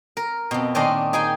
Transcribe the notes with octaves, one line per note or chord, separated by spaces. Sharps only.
A#4
F2 B2
A#2 D#3 C#4 D4 D#5 C6
D#4 G#4 G5 G#5